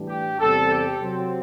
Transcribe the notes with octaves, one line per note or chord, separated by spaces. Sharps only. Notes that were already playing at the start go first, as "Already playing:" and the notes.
Already playing: A2 E3 G3 D4
G4
E2 C3 G3 C4 A4
G4
C3 F#3 C4